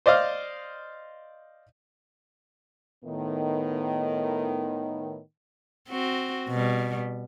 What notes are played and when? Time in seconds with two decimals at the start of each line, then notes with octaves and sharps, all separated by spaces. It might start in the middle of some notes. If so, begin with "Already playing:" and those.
0.06 C5 D5 D#5 F5
3.05 A2 D#3 B3
5.89 C4 F#4
6.48 B2 G3